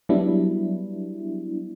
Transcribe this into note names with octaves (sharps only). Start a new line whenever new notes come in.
F#3 G3 B3 D4 E4